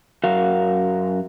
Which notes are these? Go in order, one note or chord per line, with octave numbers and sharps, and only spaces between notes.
F#2 F#4 A#4 F5